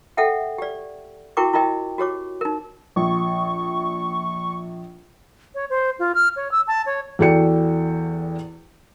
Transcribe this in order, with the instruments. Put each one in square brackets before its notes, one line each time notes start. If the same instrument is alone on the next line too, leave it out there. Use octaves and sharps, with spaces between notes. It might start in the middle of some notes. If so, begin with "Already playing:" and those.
[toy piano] A4 E5 F#5 G5
G4 D5
E4 F#4 A#4 G5 C#6 D6
E4 F4 A#4 D#5 G5
F#4 G4 C#5 D6
D#4 A#4
[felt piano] A#1 [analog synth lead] C#6
[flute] C#5
C5
F4
F6
C#5
E6
A5
C#5
[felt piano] E2 F#4 A4 D5 G5 C#7